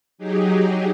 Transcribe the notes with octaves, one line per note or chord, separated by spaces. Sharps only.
F#3 D#4 G4 G#4